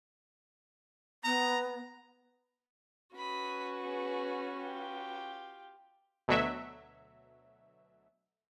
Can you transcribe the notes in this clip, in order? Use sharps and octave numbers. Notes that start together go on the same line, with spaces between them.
B3 A#5
C#4 F#4 B4 B5 D#6
B3 G#4
F4 G4
D2 B2 F#3 E5